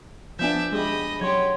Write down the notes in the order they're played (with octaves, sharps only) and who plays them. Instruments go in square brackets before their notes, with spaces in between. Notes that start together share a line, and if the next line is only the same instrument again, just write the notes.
[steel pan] F3 B3 D4 [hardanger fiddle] D5 E5 [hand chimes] G#5 G6
[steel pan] G#3 G4 [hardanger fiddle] D#5 B5
[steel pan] F#3 [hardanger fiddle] G4 C#5 [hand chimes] C6 G#6